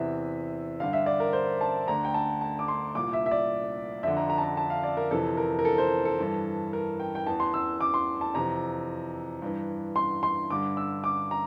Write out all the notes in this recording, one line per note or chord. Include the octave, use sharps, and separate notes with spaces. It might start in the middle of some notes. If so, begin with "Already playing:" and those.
Already playing: E2 C3 E3 E5
G2 D3 F5
E5
D5
A#4
C5
A5
D2 D3 A#5
G5
A5
A5
D6
C6
C2 A#2 D6
E5
E5
D5
F2 D3 E5
A#5
A#5
A5
A#5
A5
F5
D5
A#4
F2 C3 E3 A4
A#4
A#4
A4
C5
A4
G2 E3
A#4
G5
G5
E2 E3 A5
C6
E6
D6
C6
A5
F2 C3 E3 A#5
G2 E3
C6
C6
G2 D3 D6
E6
D6
A#5